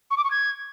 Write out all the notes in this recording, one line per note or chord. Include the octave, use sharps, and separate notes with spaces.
C#6
D6
C#6
G#6